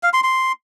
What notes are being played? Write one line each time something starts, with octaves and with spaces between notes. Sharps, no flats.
F5
C6
C6